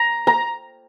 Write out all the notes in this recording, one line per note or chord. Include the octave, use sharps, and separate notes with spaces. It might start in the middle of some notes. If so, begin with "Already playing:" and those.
Already playing: A#5
A#5